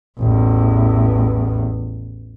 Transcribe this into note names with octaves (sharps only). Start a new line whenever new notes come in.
A1 E2